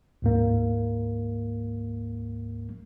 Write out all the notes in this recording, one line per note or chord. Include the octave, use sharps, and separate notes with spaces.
D2 G#2 A#3